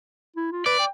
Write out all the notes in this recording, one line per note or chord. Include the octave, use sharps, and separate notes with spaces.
E4
F4
B4 D5
G5